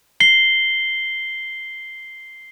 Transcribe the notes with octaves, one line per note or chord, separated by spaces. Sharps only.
C7 G7